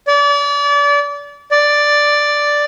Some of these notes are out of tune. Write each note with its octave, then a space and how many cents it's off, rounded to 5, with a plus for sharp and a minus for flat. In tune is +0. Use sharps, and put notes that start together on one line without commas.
D5 -35
D5 +0